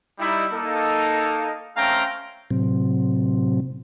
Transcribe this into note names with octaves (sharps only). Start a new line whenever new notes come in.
G3 D#4 E4
A#3 D#4 A4
A3 C4 C#4 F5 G5 A#5
A2 C3 F#3 C4